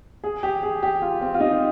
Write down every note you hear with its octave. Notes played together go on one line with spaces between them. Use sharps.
G#4
G4
G#4
G4
F4
C4
F4
D#4